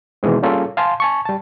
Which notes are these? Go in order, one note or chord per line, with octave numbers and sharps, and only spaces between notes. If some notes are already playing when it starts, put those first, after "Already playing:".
B2 D#3 E3 G#3 C4
G3 A#3 C#4 F4 G#4 A4
F5 G#5 A5 C6
G#5 A5 C#6
G3 A5